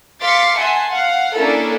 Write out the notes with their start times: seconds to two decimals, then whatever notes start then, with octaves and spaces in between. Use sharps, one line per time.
0.21 F5 C6 D6 A6 B6 C#7
0.58 E5 F#5 G#5 A5 C6
0.90 F5 F#5
1.36 A#3 C#4 D4 E4 A4 A#4